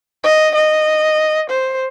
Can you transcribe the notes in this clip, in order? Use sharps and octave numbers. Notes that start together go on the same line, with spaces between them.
D#5
D#5
C5